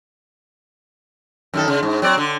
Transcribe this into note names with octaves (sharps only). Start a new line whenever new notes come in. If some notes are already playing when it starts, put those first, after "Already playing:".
F#2 D#3 A4
C#3
G#2
F#3 C4 D5
D3